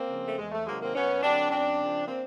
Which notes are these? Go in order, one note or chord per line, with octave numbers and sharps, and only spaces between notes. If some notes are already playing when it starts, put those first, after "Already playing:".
Already playing: A#3 C4
C#3 F3
A3
E2 G#3
A3
C3 D#3 F#3 G#3 A#3
A#3 C4
F#2 B3 C#4
D3 F#3 C4 D4
F#2 C4 D4
C#3 F3
A#3 C4